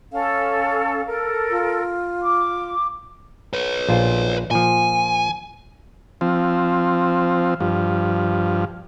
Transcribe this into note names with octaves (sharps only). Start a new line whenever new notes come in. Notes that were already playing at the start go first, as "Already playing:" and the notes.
C#4 A4 F5
A4 A#4
F4
D6
B4 C#5
A#1 F4 C5
A#2 F3 G#5
F3 C4
G2 F3